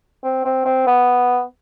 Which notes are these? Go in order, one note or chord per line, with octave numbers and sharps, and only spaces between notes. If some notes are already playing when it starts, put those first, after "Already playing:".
C4
C4
C4
B3